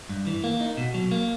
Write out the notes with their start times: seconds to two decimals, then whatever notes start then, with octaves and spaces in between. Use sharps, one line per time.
0.09 G2
0.27 E3
0.44 A#3
0.61 D#4
0.77 B2
0.94 F#3
1.11 A#3